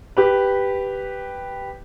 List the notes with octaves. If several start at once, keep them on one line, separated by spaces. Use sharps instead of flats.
G4 B4